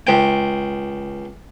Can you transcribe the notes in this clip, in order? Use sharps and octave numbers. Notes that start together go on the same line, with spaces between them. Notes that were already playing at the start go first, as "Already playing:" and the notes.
C#2 G5